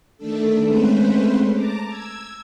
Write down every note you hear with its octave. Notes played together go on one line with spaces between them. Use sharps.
D#3 A3 D4 A4
G#3 A3 C4 C#4 B4 C5
A5 A#5 D6
E6 G#6